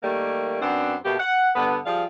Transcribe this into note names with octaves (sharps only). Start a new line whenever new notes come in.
D#3 G3 A3 A#3
F#2 B3 C4 D4
B2 A3 A#3 G4
F#5
G2 D3 B3
F3 G3 G#4 F5